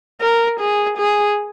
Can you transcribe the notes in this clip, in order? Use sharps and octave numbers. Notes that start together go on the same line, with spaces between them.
A#4
G#4
G#4